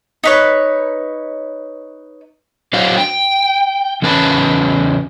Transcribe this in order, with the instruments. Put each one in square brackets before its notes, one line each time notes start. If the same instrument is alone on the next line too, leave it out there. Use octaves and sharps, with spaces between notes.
[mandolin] D#4 B4 C#5
[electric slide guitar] F#3 D4 C5 F5 F#5
G5
E2 C#3 C#4 B4 A5